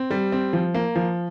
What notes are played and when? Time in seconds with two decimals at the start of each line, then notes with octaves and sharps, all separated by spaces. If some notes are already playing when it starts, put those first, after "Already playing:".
Already playing: C4
0.11 G3
0.32 C4
0.53 F3
0.74 A#3
0.96 F3